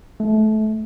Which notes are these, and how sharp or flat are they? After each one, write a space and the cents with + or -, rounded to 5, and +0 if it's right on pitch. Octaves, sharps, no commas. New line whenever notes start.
A3 -25